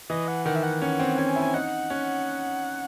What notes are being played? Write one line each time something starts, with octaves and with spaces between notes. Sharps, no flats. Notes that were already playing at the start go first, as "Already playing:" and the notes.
E3 D#5
F#5
D#3 F#5
E5
F#5
C#4 F#5
C4
C#4 G#5
E4
G#5
D#4 F#5
C#4